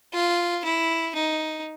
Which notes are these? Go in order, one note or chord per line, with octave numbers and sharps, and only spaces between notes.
F4
E4
D#4